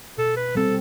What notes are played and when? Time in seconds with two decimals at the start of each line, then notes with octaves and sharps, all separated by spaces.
0.18 B2 A4
0.37 B4
0.55 G3 C4 A4